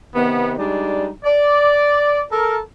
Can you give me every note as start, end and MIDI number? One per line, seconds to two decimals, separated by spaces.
0.14 0.52 48
0.14 0.52 51
0.14 0.52 59
0.58 1.08 55
0.58 1.08 56
0.58 1.08 62
0.58 1.08 63
0.58 1.08 74
1.24 2.22 74
2.31 2.58 69
2.31 2.58 70